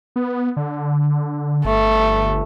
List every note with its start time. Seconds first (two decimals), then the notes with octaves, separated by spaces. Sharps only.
0.16 B3
0.57 D3
1.65 G1 A3